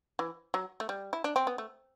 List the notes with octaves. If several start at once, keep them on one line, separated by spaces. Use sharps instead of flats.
E3
F#3
A3
G3
E4
D4
C4
B3
A3